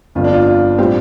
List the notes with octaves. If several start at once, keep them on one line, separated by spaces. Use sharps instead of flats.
G1 F2 D3 F4
D4
F4
F4
A2 G3 C4 F4 G4